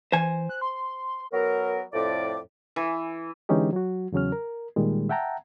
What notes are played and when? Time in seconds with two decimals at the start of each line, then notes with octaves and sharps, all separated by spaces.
0.12 E3 C5 G#5
0.49 F#6
0.61 C6
1.32 F#3 B3 A#4
1.93 F2 A2 D5 D6
2.76 E3
3.49 D3 E3 G#3 C#4 D#4 G4
3.73 F#3 F#4
4.12 E2 C#3 F#3 C#4 F6
4.32 A#4
4.76 A#2 D#3 G3 G#3
5.09 E5 F#5 G5 A5 A#5